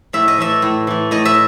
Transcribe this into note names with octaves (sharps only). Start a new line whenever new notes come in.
A2 E5
D#5
E3 A3 E5
A2
E3 A3
A2 D#5
E5